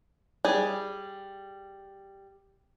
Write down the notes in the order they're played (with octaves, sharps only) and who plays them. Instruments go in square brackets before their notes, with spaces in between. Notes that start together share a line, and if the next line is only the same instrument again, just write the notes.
[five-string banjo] G3 G#4